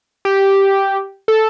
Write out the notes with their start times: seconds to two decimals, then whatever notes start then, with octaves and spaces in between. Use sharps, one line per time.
0.25 G4
1.28 A4